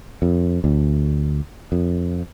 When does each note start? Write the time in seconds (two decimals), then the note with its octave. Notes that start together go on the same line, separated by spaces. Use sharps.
0.22 F2
0.64 D2
1.72 F2